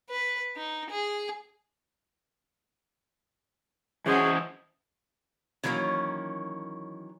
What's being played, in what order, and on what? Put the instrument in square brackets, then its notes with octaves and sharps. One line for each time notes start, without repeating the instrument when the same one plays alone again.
[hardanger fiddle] B4
D#4
G#4
[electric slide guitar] E3 C5 D#5 [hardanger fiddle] C#4 F#4 [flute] G#4
[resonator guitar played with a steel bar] D#3 E3 F#3 A#3 C#4